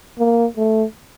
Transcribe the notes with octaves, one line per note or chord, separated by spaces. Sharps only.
A#3
A3